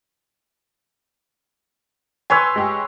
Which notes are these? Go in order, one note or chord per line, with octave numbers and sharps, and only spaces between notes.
B4 C#5 G#5 C6 E6
G#3 G4 G#4